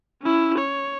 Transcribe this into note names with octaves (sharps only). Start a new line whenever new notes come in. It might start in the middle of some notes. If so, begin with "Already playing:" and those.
C#4 E4
C#5